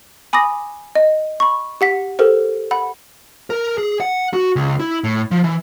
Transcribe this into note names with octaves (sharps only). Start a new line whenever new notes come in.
G#5 B5 D6 D#6 A#6
D#5
B5 C#6
G4 F#5 B6
G4 A4 A#4 C5
F#5 B5
A#4
G#4
F#5
F#4
C#2
E4
A2
F3
E3